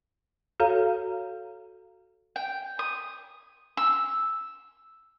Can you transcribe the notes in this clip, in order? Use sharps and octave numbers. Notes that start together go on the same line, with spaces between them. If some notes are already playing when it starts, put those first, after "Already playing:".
F#4 A4 C#5 F5 A#5
G5
D#6
E6